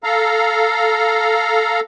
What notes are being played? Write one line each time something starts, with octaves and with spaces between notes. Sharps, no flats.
A4 F5 A#5